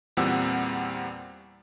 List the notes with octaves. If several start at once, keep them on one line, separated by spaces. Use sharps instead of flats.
E2 A#2 G3 C4 F#5 E6